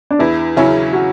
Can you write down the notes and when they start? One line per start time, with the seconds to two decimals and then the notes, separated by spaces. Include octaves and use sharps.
0.11 D4
0.19 E2 E4
0.56 C#3 F#3 C#4 E4
0.93 F#4